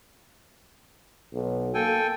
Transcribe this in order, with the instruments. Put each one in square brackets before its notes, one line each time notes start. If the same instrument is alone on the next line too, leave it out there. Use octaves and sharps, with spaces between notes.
[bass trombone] B1
[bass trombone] A#3 [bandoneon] A4 G5 G#5